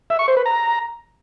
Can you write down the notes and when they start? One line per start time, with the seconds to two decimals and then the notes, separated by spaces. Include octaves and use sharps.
0.10 E5
0.19 C#6
0.28 C5
0.37 B4
0.46 A#5